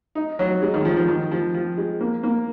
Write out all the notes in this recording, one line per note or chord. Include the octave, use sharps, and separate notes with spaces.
D#4
F#3
G#3
D#3
F3
F3
D#3
F3
F3
G#3
A#3
A#3